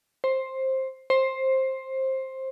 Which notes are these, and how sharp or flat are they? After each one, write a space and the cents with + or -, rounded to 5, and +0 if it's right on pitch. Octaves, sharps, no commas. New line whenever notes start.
C5 +10
C5 +15